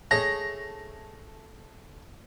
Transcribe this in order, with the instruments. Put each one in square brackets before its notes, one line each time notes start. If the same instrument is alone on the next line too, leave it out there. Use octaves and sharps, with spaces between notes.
[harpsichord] A3 G#4 C#5 [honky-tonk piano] A#6